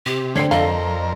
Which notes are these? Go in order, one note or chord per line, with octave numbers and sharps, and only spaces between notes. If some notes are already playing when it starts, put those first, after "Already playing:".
C3 G4
D2 C4 A4 C#5 D5 C7
F2 A4 A#4 D5 D#5 F5